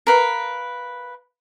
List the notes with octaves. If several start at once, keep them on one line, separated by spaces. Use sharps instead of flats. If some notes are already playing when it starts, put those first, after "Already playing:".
A#4 B4 F5